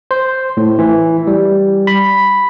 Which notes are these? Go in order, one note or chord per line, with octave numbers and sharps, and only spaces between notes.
C5
A2
E3
G3
B5